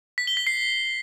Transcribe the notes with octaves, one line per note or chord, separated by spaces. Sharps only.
B6
G7
B6
C7